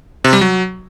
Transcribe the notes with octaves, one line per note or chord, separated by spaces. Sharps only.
C3
G3
F#3